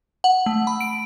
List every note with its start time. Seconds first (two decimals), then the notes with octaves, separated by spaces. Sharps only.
0.24 F#5
0.46 A3
0.67 B5
0.81 D7